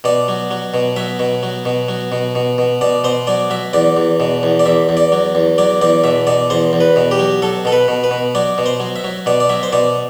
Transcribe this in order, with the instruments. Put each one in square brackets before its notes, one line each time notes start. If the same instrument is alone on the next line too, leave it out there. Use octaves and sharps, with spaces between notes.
[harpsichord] B2 D5
F#3
F#3
B2
F#3 E5
B2
F#3
B2
F#3
B2
B2
B2
B2 D5
B2 C5
F#3 D5
F#3 E5
E2 D5
E2
B2
E2
D5
E2 E5
E2
D5
F#3
E2
F#3 D5
E2 D5
B2 E5
B2 D5
E2 C5
E2
B4
B2
G4
F#3
F#3 A4
B2 A4
B4
B2
B4
B2
F#3 D5
B2
C5
F#3
E5
F#3
B2 D5
D5
F#3 E5
C5
B2 D5